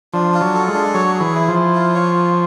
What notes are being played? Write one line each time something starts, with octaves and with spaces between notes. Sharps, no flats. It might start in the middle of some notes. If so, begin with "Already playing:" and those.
F3 D4
F4
F#3
A4
G#3
D4
F#3 C#5
G#4
E3
E4
F3
E4
F4
C#5
F4